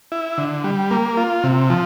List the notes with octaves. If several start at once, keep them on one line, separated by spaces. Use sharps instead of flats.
E4
D3
G3
A#3
F4
C3
F3